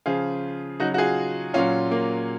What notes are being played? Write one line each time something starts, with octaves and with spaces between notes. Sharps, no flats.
C#3 F3 F4 G#4
C#3 F#3 D#4 F#4
F#4
F4 G#4
A#2 F#3 C#4 F4
A#3